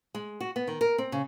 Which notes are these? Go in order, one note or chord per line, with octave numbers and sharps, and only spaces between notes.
G#3
F#4
B3
D#3
A#4
C4
C#3